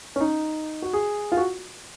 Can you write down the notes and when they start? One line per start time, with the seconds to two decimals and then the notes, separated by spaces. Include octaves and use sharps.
0.16 C#4
0.21 D#4
0.82 F#4
0.93 G#4
1.32 F4
1.37 F#4